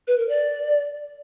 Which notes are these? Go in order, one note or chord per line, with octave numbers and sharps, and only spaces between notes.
B4
A#4
D5